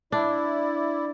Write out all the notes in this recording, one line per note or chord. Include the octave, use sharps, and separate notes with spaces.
D4 E4 D5